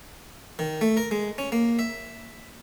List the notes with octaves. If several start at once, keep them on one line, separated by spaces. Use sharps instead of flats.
D#3
A3
A#4
G#3
C#4
A#3
E5